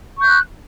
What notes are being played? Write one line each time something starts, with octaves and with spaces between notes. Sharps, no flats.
C#6 F#6 G6